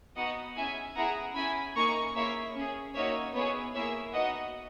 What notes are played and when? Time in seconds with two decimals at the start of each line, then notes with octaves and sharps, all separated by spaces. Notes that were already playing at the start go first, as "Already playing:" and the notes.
0.17 B3 D#4 F#4 D#5 F#5
0.56 C#4 E4 G#4 E5 G#5
0.96 B3 E4 G#4 F#5 A#5
1.36 C#4 E4 G#4 G#5 B5
1.76 A#3 D#4 G#4 A#5 C#6
2.16 A#3 E4 G#4 C#5 E5
2.55 C#4 G#4
2.95 A#3 D#4 F#4 C#5 E5
3.35 B3 E4 G#4 C#5
3.75 A#3 E4 G#4 C#5 E5
4.14 B3 D#4 F#4 D#5 F#5